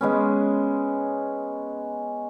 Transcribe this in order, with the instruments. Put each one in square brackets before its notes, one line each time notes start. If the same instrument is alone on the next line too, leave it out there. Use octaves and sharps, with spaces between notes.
[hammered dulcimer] G#3 B3 C#4